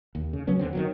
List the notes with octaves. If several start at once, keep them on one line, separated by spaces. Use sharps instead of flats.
D#2
C#3
C#3 F#3 B3 C#4
D#2 D3 B3 C4
D#3 E3 F#3